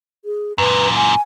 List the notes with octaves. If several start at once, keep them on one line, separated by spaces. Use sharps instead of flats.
G#4
F#2 A#2 B4
G#5